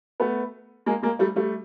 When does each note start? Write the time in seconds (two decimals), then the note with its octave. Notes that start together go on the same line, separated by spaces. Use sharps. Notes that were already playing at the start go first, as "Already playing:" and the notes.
0.20 A3 B3
0.86 G#3 A#3
1.02 G#3 A#3
1.19 G3 A3
1.36 G3 A3